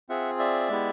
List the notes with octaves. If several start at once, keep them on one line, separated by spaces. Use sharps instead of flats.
C4 F4 G#4 E5 F#5
D5 E5
G#3 B3 E4 G4